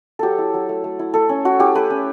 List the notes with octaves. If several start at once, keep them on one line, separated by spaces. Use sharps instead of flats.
F#3 G4 A4
E4
F#3
A3
A3
E4
A3 A4
C#4
A3 F#4
E4 G4
A3 B4
C#4